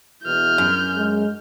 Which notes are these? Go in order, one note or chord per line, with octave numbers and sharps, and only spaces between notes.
E2 B2 E4 F6 G6
F#2
G#3